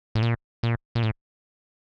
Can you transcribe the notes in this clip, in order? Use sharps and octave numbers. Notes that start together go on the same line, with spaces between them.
A2
A#2
A#2
A#2
A2